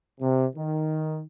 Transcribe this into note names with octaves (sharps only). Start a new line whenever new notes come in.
C3
D#3